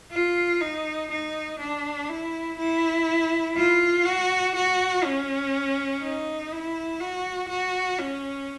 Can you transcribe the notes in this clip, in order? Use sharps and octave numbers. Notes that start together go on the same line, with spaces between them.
F4
D#4
D#4
D4
E4
E4
F4
F#4
F#4
C#4
D#4
E4
F#4
F#4
C#4